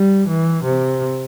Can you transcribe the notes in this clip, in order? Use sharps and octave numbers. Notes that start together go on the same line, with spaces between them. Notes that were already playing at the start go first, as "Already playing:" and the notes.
Already playing: G3
E3
C3